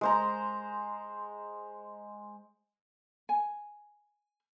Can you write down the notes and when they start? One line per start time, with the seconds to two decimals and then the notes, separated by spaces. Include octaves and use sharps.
0.01 G#3 C5 A#5
3.29 G#5